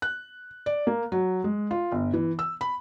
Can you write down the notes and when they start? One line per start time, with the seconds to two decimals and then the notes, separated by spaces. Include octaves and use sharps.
0.02 F#6
0.66 D5
0.87 A#3
1.12 F#3
1.44 G#3
1.71 F4
1.92 G1
2.13 E3
2.39 E6
2.61 B5